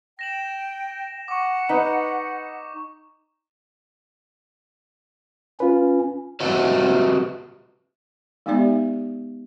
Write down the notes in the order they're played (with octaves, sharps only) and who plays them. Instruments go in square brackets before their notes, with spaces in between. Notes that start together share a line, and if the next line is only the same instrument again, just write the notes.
[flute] G5 [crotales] A#6 E7 F#7
[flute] F#5 [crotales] C#6 D6
[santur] D#4 [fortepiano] B4
[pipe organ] C#4 [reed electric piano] F4 B4
[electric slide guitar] F#4 G4 B4 D#5 E5
[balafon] G#3 B3 D#4 G4 D5 E5